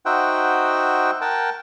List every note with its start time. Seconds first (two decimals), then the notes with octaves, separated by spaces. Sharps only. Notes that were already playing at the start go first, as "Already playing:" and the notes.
0.06 D#4 F#4 C5 E5 F#5 G5
1.21 A#4 F#5 G5 A5